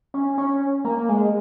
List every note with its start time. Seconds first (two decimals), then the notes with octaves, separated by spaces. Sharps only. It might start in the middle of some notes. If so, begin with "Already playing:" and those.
0.14 C#4
0.38 C#4
0.85 A#3
1.09 G#3